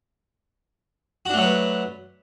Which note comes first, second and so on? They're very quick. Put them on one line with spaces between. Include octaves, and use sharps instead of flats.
F#4 D4 A3 F#3 B4